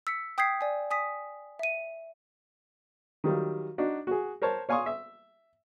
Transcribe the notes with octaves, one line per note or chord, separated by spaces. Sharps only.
E6 B6 C#7
G5 D#6 G6 G#6 B6 C7
D5 G#5
G#5 D#6 B6
E5 D#7
D#3 F#3 G3 F4
D4 D#4 F#4
F#4 G#4
A#4 C5 C#5 A5
C#5 F5 G#5 C6 C#6 D#6
E5